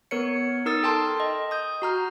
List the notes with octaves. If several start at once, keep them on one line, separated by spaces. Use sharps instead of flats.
B3 A#4 C#5 C#7
D#4 A#4 D#6 E6 A6
A4 G5 A5 C6
D#5
D#6 G6
F#4 A#5 F6